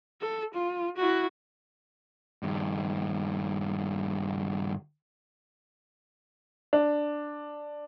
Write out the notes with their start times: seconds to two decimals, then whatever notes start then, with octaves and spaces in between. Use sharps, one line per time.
0.21 A4
0.54 F4
0.97 E4 F#4
2.43 G2 D#3
6.73 D4